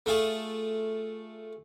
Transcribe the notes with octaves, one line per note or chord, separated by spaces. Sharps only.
A3 F4 G#4